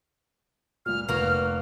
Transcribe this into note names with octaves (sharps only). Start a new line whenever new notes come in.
C#2 A#2 F6
F1 A#3 F#4 B4 F6